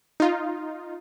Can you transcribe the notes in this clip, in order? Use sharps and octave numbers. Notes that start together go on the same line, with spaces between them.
D#4 F4